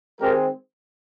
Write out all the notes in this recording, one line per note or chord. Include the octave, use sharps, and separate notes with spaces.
D#3 G#3 C4 G4 A#4